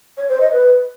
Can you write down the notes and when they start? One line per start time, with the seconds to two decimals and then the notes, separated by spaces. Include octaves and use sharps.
0.17 C#5
0.29 C5
0.40 D#5
0.52 B4